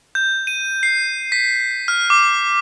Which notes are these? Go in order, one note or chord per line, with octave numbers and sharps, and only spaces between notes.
G6
D#7
C7
B6
F6
D6